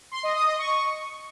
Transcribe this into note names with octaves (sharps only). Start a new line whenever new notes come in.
C6
D#5
D#6
D#5
C#6